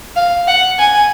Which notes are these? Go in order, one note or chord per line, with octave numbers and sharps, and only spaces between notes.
F5
F#5
G#5